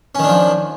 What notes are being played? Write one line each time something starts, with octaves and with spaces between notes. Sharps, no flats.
D#3 F3 C#4 D4